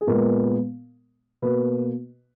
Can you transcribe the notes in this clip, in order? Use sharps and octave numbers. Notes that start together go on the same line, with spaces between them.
G#4
A#2 G#3 B3 A#4
B2 A#3 B4